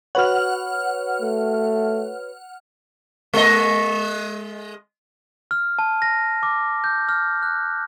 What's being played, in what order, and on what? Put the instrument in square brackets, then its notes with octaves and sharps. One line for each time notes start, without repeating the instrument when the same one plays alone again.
[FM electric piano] F#4 B4 C#5 [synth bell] F#5 F6
[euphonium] A3
[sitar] G#3 D#5
[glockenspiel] F6
A5
A#6
D6
G6
F6
F#6